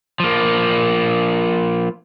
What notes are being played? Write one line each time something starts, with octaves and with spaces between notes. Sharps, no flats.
F3 A#3